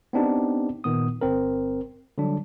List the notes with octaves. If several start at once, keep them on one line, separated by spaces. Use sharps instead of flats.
B3 C4 D4 D#4 G4
A#2 D#3 B3 D#6
G1 C4 A#4
D3 F#3 G3 D4